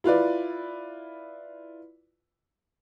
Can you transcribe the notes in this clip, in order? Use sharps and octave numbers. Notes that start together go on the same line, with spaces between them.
E4 F4 B4 D5